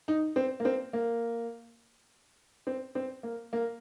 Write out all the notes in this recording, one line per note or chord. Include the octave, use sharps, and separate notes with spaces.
D#4
C4
A#3
C4
A#3
C4
C4
A#3
A#3